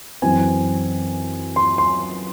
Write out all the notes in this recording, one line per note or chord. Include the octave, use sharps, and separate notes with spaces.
F#2 E3 C4 G#5
C6
C6